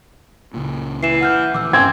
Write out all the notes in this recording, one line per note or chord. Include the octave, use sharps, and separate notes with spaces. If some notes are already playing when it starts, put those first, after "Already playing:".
C#2 A#2
E3 C7 E7
F#5 F6 G6
A1 A#2 E3 D6 E6
G2 E3 C4 C#4 G#5 C6 G#6